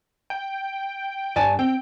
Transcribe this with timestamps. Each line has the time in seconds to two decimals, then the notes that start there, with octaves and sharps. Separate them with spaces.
0.30 G5
1.36 G2 D5 G#5 A5
1.59 C4 G5